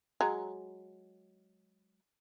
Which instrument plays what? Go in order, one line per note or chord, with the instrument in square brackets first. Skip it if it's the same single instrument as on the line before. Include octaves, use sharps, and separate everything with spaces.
[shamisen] F#3 G#3 A#5